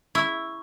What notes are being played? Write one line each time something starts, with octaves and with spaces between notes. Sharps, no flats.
E4 C#6 E6